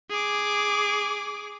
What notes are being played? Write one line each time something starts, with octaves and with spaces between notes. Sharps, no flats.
G#4 D6